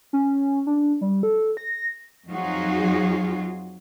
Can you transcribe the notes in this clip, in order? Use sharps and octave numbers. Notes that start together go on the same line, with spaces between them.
C#4
D4
G3
A4
A#6
F2 F#3 D#4 F4 F#4 G#4